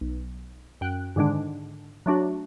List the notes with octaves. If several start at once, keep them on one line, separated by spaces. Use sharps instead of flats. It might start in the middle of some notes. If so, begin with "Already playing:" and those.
B1
F#2 G5 F#6
G#2 D3 D#3 G#3 D4
F#3 A3 D4 F#4